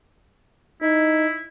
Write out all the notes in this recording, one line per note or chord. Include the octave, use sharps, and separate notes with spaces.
D#4 E4